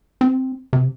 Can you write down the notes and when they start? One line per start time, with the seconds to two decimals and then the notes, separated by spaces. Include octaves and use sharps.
0.21 C4
0.73 C3